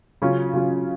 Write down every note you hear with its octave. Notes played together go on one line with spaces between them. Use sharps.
C#3 F#3 C#4 F4
C#3 F#3 C#4 F4